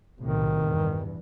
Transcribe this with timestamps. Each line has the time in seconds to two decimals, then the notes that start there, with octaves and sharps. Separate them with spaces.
0.21 B1 A2 C3 D#3
0.66 E2 G2